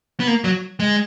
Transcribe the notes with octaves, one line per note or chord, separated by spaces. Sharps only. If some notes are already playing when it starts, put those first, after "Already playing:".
B3
A#3
F#3
G#3